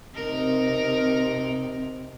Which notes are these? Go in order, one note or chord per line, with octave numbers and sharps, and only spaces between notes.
C3 D#4 A#4